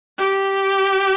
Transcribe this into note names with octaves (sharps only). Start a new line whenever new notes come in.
G4